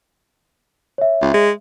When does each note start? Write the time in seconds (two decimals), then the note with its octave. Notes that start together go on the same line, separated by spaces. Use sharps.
0.98 C#5 E5
1.22 C#2
1.34 G#3